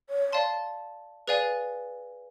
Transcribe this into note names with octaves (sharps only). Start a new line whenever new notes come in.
C#5
D5 F5 A5 C6
G#4 B4 D5 F5 G#5